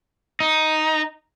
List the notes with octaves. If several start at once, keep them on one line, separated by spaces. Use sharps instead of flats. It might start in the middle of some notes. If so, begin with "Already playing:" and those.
D#4